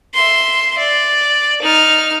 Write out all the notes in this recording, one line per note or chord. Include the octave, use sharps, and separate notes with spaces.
E5 C6
D5
D#4 F6